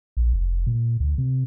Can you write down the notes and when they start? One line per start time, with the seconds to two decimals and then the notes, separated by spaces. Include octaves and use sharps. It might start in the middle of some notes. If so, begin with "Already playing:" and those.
0.17 A#1
0.33 F1
0.67 A#2
1.00 D2
1.18 C3